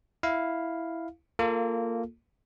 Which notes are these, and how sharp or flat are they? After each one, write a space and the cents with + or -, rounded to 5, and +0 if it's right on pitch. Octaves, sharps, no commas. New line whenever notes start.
E4 +0 F5 +0
A#3 -15 F4 +0 A4 -5